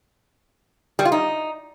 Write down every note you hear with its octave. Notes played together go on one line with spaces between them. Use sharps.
G3
F4
D#4